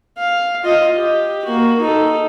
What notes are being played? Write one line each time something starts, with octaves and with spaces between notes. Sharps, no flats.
F5
F4 D#5
G4
A#3 F#4
D#4 A4